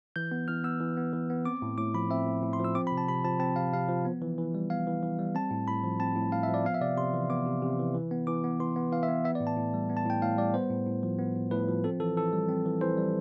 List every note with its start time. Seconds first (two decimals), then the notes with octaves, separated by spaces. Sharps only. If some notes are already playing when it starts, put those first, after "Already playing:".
0.16 E3 G6
0.31 B3
0.48 E3 F6
0.64 B3 E6
0.80 E3
0.97 B3
1.13 E3
1.30 B3
1.45 C4 D6
1.62 A2
1.78 A2 D6
1.94 F3 B5
2.10 C4 E5
2.27 A2
2.43 A2
2.53 C6
2.60 F3 E6
2.75 C4 D6
2.87 B5
2.92 C3
2.98 A5
3.08 C3 B5
3.24 F3 A5
3.40 C4 A5
3.56 C3 F5
3.73 C3 F5
3.88 F3
4.05 B3
4.22 E3
4.38 E3
4.55 G3
4.70 B3 F5
4.87 E3
5.03 E3
5.19 G3
5.35 C4 A5
5.51 A2
5.68 A2 B5
5.84 F3
6.00 C4 A5
6.16 A2
6.32 A2 F5
6.43 E5
6.48 F3
6.54 D5
6.65 B3 F5
6.74 E5
6.81 C3 D5
6.97 C3 C6
7.14 E3
7.30 B3 D6
7.46 C3
7.62 C3
7.79 E3
7.94 E3
8.11 B3
8.27 E3 D6
8.44 B3
8.60 E3 C6
8.76 B3
8.92 E3 F5
9.03 E5
9.08 B3
9.24 B3 E5
9.35 D5
9.40 A2
9.47 A5
9.57 A2
9.74 G3
9.89 B3
9.97 A5
10.06 A2 G5
10.22 A2 F5
10.38 G3 D5
10.54 B3 C5
10.70 A2
10.86 A2
11.03 F3
11.19 B3
11.36 A2
11.51 A2 B4
11.68 F3
11.84 C4 A4
12.00 E3 A4
12.17 E3 A4
12.33 G3
12.49 C4
12.65 E3
12.81 E3 C5
12.97 G3